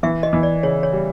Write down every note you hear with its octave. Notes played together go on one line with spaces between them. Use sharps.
E3 E5
D#5
E3
D5
C#3 C#5
C#5
G3